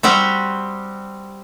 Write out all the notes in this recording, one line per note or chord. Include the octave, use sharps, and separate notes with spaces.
G3 C4 F#4 G4